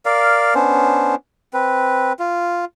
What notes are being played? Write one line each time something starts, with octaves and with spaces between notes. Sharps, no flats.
A#4 D5 F5
B3 C#4 D4 C5
C4 B4
F4